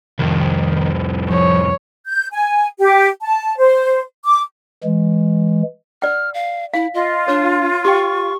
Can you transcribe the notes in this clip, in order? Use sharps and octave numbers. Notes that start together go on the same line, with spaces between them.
C2 F2 D#3
F3 C#5
G6
G#5
G4
A5
C5
D6
E3 G#3
D5 F#5 F6
F5
E4 F5
F4 D#5
D4 C#5
G4 G5 C#6